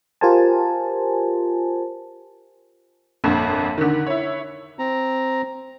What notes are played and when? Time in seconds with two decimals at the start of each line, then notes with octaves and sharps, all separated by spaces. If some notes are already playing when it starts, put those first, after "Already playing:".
0.21 F4 G4 A#4 C5 G#5 A5
3.24 G1 F2 A#2 D3
3.78 D3 D#3
4.07 E4 C#5
4.79 C4 A#5